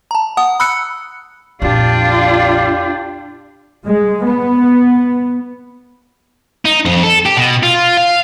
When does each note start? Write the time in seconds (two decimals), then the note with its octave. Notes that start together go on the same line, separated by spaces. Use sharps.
0.11 A5 A#5
0.37 F#5 D#6
0.60 B5 E6 F#6 C#7
1.62 A#1 F2 D4 F4 G4
3.85 G#3
4.24 B3
6.65 D#4
6.86 F2
7.03 A4
7.26 G4
7.37 B2
7.63 F4
7.98 F5